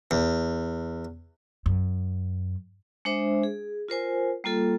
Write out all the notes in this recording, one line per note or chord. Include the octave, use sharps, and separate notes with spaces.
E2
F#2
G#3 D4 C5 E5
G#4
F4 A#4 C5 G#5
G3 A#3 F4 A4